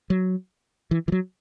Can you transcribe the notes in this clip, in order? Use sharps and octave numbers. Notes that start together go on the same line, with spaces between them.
F#3
E3
E3
F#3